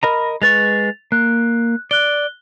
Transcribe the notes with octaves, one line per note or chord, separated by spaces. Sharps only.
A#4 D#5 A#5 B5
G#3 B4 C#6 A6 F7
A#3 F#6
D5 F#6 G7